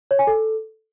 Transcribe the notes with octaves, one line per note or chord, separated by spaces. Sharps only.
C#5
G#5
A4